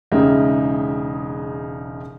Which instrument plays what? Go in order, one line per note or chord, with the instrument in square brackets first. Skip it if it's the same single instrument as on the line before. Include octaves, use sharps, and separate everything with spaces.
[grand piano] E1 C#3 G#3 D#4 G4 E5